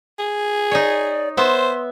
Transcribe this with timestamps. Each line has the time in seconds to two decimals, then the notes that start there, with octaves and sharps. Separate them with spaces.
0.19 G#4
0.71 D#4 C#5 D5
1.37 B3 C5 E5 C6